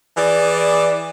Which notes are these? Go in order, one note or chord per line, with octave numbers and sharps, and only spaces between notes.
E3 G#4 D5